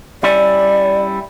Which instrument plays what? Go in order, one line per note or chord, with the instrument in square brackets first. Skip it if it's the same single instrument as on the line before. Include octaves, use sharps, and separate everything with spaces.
[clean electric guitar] G3 C#4 E4 [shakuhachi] D5